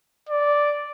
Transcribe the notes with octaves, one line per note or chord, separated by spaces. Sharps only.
D5